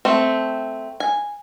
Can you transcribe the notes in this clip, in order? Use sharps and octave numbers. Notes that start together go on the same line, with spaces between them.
A3 C4
G#5